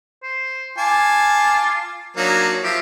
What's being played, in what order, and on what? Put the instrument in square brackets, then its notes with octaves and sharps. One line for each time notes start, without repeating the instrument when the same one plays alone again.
[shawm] C5
[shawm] F4 [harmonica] G#5 A5 D6
[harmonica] F#3 A#3 D4 [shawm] D#4
[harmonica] F3 E5 [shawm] G4